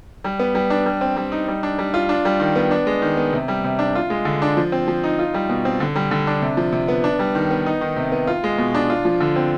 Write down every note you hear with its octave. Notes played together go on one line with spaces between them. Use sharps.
G3
B3
G3
D4
G3
C4
G3
D#4
G3
D4
G3
F4
D4
G3
D#3
B3
D4
G#3
D#3
B3
C3
G3
C3
D4
F4
G#3
D3
D4
F3
C4
F3
D#4
F4
G3
B2
C4
D3
G3
D3
D4
C3
F3
C3
B3
D4
G3
D#3
B3
D#4
D#3
C3
B3
F4
G#3
B2
D4
F4
F3
D3
C4